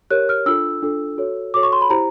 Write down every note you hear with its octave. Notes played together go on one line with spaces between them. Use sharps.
G4 A#4 C#5 F#6
F6
D4 F4 A4 E6
D4 F4 A4
F#4 A4 C#5
F#4 A4 C#5 D6
C#6
C6
B5
E4 G4 C5 A#5